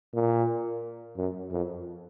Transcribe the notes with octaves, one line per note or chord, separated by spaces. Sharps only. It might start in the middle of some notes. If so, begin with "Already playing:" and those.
A#2
F#2
F2